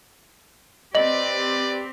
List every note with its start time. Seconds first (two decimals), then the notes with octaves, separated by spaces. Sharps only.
0.95 C4 G4 B4 D5 D#5 F#7